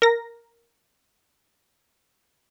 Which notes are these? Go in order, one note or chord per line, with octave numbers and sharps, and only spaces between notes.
A#4 A#6